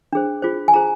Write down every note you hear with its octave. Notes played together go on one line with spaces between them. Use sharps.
D4 G#4 C5
F4 G#4 C5
G#5
F4 G#4 C5 A#5